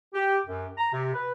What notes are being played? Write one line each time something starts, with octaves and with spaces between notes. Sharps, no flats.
G4
F#2
A#5
C3
B4